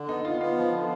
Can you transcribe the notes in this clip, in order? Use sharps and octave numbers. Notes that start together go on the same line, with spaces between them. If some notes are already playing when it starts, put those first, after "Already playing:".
Already playing: D3
B3 D#4
B3 F4
B3 F4
F3
D3